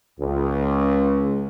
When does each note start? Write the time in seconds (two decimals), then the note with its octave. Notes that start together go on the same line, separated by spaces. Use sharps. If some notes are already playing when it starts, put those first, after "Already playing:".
0.20 C#2